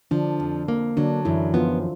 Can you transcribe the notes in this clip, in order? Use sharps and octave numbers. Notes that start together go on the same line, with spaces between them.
D3 F3 D4
F2
A#3
D3 F#3 D4
F#2 E3 E4
F3 B3 F4